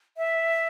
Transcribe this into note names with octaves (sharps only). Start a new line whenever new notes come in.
E5